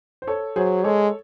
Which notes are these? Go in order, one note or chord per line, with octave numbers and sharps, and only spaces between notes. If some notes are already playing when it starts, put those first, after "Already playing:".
C5
A4 C#5
F#3 G#4 C5
G#3 A4 C#5